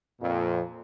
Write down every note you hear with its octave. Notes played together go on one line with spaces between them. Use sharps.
F2 A#2